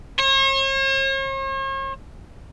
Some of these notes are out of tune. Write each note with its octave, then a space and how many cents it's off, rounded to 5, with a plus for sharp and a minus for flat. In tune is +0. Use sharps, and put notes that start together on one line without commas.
C#5 -45